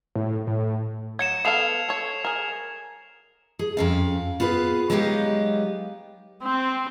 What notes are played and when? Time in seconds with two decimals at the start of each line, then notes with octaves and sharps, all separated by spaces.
0.16 A2
0.47 A2
1.19 F#3 G#6 C#7 E7
1.45 B3 A4 F5 C7 F7
1.89 A4 C#5
2.24 G#4 A#4
3.59 G#4
3.77 F2 C#4 F5
4.40 B3 F4 G#4 B4
4.90 F#3 G#3 B3 D#4 G4 F5
6.42 C4